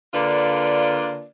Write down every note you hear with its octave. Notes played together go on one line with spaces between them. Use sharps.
D3 A#3 D4 F4 B4 D5